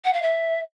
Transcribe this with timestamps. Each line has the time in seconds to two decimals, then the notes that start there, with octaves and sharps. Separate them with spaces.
0.04 F#5
0.13 F5
0.22 E5